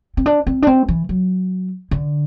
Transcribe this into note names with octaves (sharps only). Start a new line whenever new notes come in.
C4
D4
C4
D4
C4
E3
F#3
D3